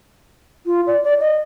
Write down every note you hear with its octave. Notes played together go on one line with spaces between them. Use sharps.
F4
D5
D5
D#5